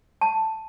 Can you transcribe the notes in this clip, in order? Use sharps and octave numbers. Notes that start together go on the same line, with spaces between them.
A5